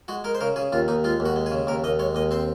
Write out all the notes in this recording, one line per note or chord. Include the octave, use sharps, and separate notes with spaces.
G#3 F#4
G#3 A#4
C5
C#3 A#4
C#3 G#4
D#2 F4
D#2 D#4
G#3 F4
D#2
F#4
G#3
G#4
C#3
D#2 A#4
D#2 D#5
G#3 C#5
D#2 D#5
C4 C5